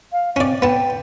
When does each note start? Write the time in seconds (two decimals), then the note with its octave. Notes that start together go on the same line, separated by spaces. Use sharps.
0.12 F5
0.36 C4 C#4 D5
0.62 B3 G5 A5